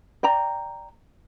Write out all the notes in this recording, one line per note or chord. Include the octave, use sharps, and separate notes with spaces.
D5 G5 A#5